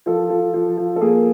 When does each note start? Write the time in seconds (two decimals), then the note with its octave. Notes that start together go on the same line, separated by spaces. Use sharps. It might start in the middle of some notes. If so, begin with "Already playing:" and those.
0.06 F3 A4
0.30 F3
0.54 F3
0.77 F3
0.96 A4
1.01 A#3 G#4